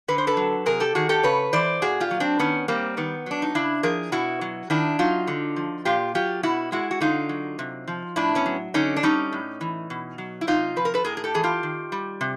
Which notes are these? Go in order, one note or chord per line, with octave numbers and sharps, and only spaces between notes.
D3 B4
C5
A4 B4
F#3
C3 G#4 A#4
G4 A4
D#3 F#4 G#4
G4 A4
C#3 B4 C#5
E3 C5 D5
A#2 F#4 G#4
F4 G4
F#3
C4 D4
D#3 B3 C#4
G3 A#3 C4
D#3 B3
F#3 D4
D#4
C#3 D4 E4
F3 G#4 A#4
B2 E4 F#4
F#3
D#3 D4 E4
F#3 D#4 F4
D3
F3
A#2 F4 G4
F#3 F4 G4
B2 E4 F#4
G#3 E4 F#4
F#4
D3 D#4 F4
F#3
C3
F3
A2 D4 E4
B3 C#4
F#3
D3 C#4 D#4
D4
G3 C#4 D#4
A2
E3
B2
F#3
E4
C3 D#4 F4
F3 B4
A#4
A4 B4
A2 G#4 A#4
G#4
G4 A4
E3 G#4
F4 G4
D#3
G3
C3